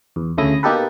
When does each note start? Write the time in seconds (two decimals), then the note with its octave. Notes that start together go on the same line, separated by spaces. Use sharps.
0.16 E2
0.38 D2 C#3 A3 E4 D#6 A#6
0.63 B2 A#3 D#4 G4 A4 B4